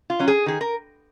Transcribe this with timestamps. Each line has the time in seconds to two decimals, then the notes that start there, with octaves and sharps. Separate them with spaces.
0.10 F4
0.19 F#3 C#4
0.28 G#4
0.46 D#3 G#4
0.61 A#4